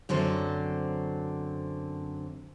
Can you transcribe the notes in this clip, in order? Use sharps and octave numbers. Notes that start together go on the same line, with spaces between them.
F#2 D3 F#3 C4 C5